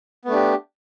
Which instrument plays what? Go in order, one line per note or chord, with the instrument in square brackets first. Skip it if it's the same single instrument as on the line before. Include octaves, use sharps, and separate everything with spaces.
[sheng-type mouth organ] B3
A3
D4
G4